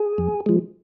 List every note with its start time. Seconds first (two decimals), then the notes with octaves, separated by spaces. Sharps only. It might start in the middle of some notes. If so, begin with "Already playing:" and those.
Already playing: G#4
0.18 F2
0.46 F3 G#3